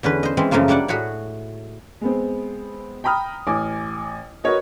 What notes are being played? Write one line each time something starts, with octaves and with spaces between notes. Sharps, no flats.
E2 D3 C#4 B4
C5 D#5
E3 G#3 C4 C#4
F#2 C#3 F3 A3 A#3 F4
G3 A#3 D4 D5 F#5
A2 F#4 G#4 C#5 B5
G#3 B3 C4
G5 A#5 B5 D#6 F6
A1 G#5 D6
F#4 A#4 B4 C#5 D#5